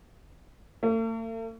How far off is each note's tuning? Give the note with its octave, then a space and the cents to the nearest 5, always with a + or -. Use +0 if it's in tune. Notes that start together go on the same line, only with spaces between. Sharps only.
A3 +45